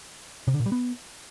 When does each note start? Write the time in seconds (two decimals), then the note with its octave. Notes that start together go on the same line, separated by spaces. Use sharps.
0.48 C3
0.54 D3
0.60 A#2
0.66 G3
0.72 B3